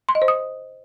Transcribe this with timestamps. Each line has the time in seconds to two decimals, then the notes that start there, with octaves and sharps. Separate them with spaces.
0.09 C6
0.15 D#5
0.22 C5
0.28 D#6